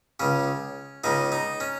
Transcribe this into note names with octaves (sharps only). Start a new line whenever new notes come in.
C#2 C#3 C#4
C#2 C#3 D#4
D#4
C#4